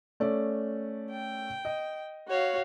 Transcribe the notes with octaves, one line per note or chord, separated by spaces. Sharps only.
A3 C#4 D5
G5
D#5
F#4 C#5 F5